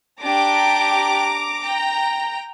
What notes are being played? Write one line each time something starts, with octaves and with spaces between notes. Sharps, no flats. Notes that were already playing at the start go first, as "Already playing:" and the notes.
D4 G4 A#5 D6
G5 A#5